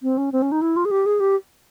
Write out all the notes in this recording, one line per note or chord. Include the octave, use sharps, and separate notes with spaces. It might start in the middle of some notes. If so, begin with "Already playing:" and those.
C4
C#4
C4
C#4
D#4
E4
F4
G#4
G4
G#4
G4